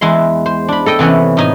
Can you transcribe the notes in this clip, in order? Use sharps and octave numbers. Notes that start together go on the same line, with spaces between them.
E2 G#3 E4 C6
C5
D4 B5
A4 D#5 G5
C3 E3 B3 C#4
A2 D#4 G#5